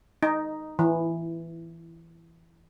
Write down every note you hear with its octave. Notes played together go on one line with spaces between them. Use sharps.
D#4
E3